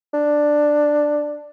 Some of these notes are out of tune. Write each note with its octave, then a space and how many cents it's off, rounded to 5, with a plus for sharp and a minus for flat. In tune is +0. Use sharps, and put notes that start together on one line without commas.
D4 +10